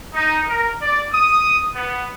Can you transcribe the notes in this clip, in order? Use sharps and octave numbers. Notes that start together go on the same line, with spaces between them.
D#4
A#4
D5
D#6
B3